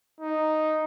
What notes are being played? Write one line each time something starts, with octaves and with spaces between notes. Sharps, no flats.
D#4